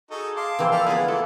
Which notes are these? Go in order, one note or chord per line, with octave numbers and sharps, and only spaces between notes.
D#4 F#4 G#4 A4
F5 A5 C6 D6
E3 A#3 C4
F3 A4 D5 E5 A5 F6
D3 B3 E4 F4 G#4 B4 B5
A#3 D4 E4 F4 A4